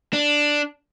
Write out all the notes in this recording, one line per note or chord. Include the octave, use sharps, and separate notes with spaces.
D4